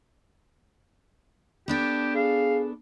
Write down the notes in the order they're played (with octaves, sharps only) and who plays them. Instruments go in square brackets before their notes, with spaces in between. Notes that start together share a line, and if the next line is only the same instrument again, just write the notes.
[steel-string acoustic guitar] B3 D4 A4 [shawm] G4
[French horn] G#4 [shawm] F5